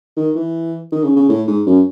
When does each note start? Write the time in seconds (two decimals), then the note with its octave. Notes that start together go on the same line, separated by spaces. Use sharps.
0.17 D#3
0.35 E3
0.92 D#3
1.04 C#3
1.16 C#3
1.29 A2
1.47 G#2
1.66 F#2